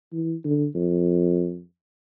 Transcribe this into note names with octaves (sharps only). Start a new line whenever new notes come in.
E3
D3
F2